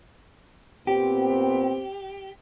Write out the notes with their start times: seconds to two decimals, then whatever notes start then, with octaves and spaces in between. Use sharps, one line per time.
0.87 A#2 B3 C4 G4